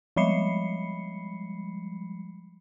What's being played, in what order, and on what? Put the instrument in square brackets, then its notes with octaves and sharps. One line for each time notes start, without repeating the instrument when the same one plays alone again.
[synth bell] F3 G3 G#3 B5 C7 C#7